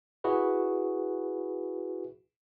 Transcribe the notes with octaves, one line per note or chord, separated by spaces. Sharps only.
E4 F#4 G#4 B4